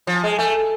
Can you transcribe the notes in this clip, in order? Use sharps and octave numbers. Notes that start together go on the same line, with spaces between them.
F3
G#3
A3